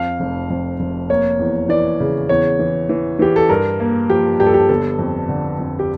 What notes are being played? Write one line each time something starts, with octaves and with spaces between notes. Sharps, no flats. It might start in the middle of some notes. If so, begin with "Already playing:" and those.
Already playing: F2 F5
F1
F2
F1
A#3 C#5
E2
E3 D5
C#3
E2 C#5
E3
E3
E3 G4
A4
G2 A#4
A#3
F3 G4
G2 G4
A4
G4
G1 A4
F2
D3
F2
G4